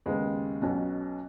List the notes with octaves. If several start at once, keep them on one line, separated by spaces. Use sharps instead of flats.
D#2 C#3 G#3 B3
B1 B2 F#3 C#4